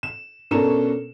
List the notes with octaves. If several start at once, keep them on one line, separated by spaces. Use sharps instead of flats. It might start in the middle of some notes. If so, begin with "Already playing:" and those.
E7
B2 C#4 D4 A4 A#4 E7